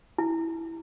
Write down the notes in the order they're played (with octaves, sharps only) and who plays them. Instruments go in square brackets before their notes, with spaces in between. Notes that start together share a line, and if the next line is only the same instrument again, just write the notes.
[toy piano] E4